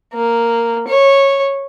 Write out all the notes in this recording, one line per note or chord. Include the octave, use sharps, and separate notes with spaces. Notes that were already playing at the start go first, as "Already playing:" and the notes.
A#3
C#5